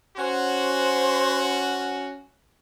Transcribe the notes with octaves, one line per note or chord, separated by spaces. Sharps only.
C#4 F#4 C5